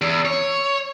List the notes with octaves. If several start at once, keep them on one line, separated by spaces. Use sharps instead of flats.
E2
C#5